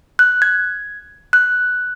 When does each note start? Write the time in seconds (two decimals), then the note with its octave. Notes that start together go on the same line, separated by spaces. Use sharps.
0.19 F#6
0.42 G#6
1.33 F#6